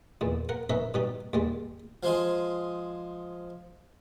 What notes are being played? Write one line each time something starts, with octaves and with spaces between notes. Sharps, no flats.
E2 A#2
A#4 F#5
C#4 D#4 A#4 B4 E5
B2 G3 D#4
D#2 G3 G#3
F3 G#3 G#4